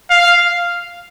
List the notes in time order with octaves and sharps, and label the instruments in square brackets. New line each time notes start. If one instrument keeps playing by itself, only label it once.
[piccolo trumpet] F5